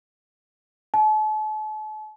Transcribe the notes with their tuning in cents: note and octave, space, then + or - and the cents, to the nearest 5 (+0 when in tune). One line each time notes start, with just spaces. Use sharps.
A5 -40